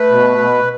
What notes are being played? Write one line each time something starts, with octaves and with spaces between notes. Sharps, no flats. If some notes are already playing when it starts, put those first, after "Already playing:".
Already playing: A3 B4
B2
B2